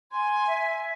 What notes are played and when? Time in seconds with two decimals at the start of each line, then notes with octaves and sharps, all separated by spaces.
0.12 G#5 C6
0.47 E5